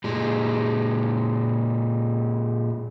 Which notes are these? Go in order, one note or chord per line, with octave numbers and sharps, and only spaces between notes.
A#2 G#3